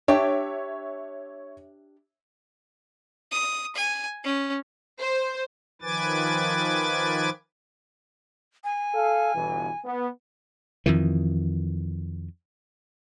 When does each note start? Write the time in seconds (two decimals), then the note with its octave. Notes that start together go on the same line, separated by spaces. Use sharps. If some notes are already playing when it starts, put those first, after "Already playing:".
0.08 D4 G4 C#5 E5 G5
3.32 D#6
3.76 G#5
4.25 C#4
5.00 C5
5.82 D#3 F3 B4 G#5 D6 A6
8.64 G#5
8.94 A4 F5
9.34 G1 B2 E3
9.85 B3
10.86 F2 D#3 E3